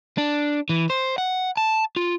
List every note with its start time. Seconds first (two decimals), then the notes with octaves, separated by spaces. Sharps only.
0.18 D4
0.69 E3
0.90 C5
1.18 F#5
1.57 A5
1.96 F4